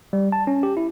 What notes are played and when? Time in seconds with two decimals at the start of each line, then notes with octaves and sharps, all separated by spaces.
0.13 G3
0.32 A5
0.47 C#4
0.63 G4
0.77 E4